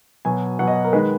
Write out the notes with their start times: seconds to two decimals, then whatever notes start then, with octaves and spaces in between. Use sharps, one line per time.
0.25 B2 F#3 G#5
0.59 B2 F#3 F#5
0.67 D#5
0.84 A#4
0.93 D#3 G#3 B4